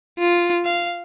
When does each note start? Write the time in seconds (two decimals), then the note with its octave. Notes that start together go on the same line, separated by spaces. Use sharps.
0.19 F4
0.65 F5